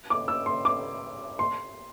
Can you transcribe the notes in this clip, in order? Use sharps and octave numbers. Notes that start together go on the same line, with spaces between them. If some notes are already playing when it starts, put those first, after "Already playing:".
D6
E6
C6
D6
C6